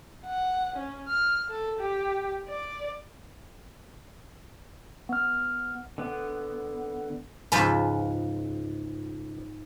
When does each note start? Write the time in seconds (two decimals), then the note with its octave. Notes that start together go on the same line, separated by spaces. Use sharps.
0.26 F#5
0.76 C#4
1.08 F6
1.50 A4
1.79 G4
2.48 D5
5.09 B3 F6
5.98 D3 B3
7.52 C#2 G#2 F3 B4 G#5